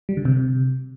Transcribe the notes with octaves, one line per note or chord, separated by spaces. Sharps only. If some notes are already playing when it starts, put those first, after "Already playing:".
G3
D3
C3